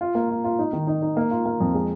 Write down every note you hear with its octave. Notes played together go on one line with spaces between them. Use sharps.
F4
A#3
F4
F4
D#4
D#3
D#4
D#4
A#3
F4
A#3
F2
G#3